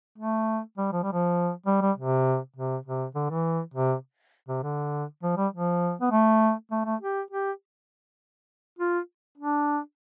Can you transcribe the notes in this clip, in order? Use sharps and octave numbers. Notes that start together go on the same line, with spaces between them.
A3
G3
F3
G3
F3
G3
G3
C3
C3
C3
D3
E3
C3
C3
D3
F3
G3
F3
B3
A3
A3
A3
G4
G4
F4
D4